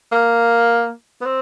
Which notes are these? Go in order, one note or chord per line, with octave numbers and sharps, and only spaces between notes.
A#3
B3
C4